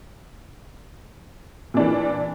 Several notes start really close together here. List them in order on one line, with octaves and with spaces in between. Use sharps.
A#2 D4 E3